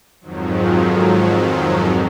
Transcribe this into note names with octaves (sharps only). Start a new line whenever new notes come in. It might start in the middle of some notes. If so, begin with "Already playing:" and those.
F2 G#2 D#3 F3 F#3